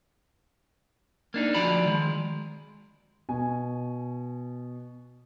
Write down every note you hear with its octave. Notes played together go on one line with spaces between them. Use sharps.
A#3 D4 D#4
D2 F3 F#4 D5 A#5 B5
D#3 G#3
B2 G#5